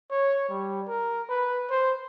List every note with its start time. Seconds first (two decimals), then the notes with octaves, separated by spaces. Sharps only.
0.10 C#5
0.49 G3
0.88 A#4
1.29 B4
1.70 C5